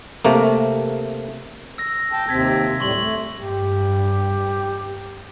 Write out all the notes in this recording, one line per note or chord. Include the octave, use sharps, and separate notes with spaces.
C3 A3 A#3
E6 A#6
G5 A5
D#2 C3 C4 G#6 B6
A2 G3 C6 C#6 F#7
A3
G2 G4